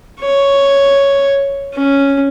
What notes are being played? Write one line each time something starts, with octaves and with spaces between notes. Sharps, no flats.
C#5
C#4